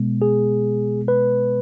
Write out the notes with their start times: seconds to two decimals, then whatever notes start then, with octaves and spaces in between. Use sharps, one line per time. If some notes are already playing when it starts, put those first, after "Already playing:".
Already playing: B2 G#3 B3
0.22 G#4
1.08 B4